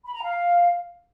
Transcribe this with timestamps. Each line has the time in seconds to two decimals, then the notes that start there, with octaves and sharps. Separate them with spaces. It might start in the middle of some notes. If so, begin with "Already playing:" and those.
0.05 B5
0.14 A#5
0.23 F5